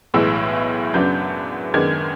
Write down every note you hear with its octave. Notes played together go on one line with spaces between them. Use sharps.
B1 A2 E3 G#3 E6
F#2 C#3 F#3 B3 D4 G6
F#2 D#3 G#3 B3 D4 G#6